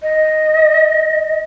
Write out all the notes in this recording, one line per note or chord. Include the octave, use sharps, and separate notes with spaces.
D#5